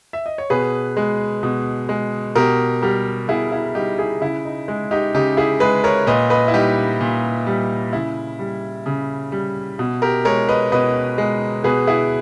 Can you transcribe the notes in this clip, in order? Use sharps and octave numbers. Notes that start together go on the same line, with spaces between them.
E5
D#5
C#5
B2 G#4 B4
G#3
B2
G#3
B2 G4 A#4
G3 G4 A#4
B2 E4 G#4
E4
G3 D#4 G4
E4 G#4
C#3 E4
D#4
G#3
D#4 G4
C#3 D#4 G4
E4 G#4
G#3 G#4 B4
A#4 C#5
A#2 B4 D#5
B4 D#5
E4
G3 D#4 G4
A#2
G3
C#3 E4
G3
C#3
G3
B2
G4 A#4
G#3 A#4 C#5
B4 D#5
B2 B4 D#5
G#3
B2 G#4 B4
E4 G#4